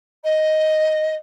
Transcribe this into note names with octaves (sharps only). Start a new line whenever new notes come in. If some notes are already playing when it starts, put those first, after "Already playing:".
D#5